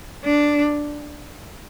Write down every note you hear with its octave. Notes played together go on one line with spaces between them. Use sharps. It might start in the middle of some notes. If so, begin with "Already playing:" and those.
D4